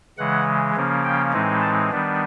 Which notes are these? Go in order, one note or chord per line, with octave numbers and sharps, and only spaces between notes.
C#3 E3 G#3 F#5
C#3 F3 A#3 C#4
G5
A2 E3 G#3 C4 D#4
A5
D#3 G3 B3 D4